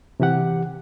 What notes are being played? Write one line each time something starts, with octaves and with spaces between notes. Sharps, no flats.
C3 E3 G4 F#5